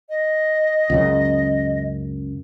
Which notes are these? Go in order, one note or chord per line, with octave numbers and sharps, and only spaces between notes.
D#5
C#2 F#2 C#3